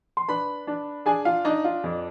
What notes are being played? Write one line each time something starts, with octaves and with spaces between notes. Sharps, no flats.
C6
D4 B4 B5
D4
D4 G#4 G#5
F4 F5
D4 D#4 D#5
F4
F2